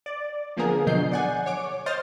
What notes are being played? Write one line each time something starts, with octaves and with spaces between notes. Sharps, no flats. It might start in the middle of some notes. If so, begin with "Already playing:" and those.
D5
D3 F3 A#3 B3 G#4 A#4
B2 D3 F#3 D#5 G6 C7
D5 F#5 G#5
C#5 D6
C5 D#5 C6 F6 G6 A6